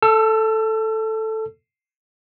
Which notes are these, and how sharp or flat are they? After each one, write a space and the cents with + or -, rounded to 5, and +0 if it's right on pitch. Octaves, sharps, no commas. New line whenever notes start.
A4 +0 E6 +35